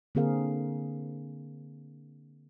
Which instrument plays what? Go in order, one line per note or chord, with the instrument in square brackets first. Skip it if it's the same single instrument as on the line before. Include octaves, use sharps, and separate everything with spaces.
[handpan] D3 A#3 C4 G#4 A#4 F5